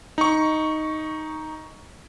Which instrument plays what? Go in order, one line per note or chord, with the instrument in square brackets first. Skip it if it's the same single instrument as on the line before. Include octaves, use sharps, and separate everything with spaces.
[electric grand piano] D#4 C#6